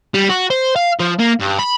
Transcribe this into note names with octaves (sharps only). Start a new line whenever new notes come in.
G3
F#4
C5
F5
F3
A#3
G2
B5